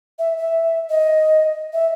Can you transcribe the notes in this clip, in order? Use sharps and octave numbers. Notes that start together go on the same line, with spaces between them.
E5
E5
D#5
E5